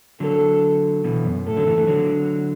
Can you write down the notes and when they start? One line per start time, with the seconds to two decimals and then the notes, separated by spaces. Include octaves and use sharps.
0.20 D3 F#3 A4
1.04 B2 E3
1.25 F#2
1.46 A2 A4
1.57 D3 F#3
1.67 E3 A3
1.77 E3 A3
1.87 D3 F#3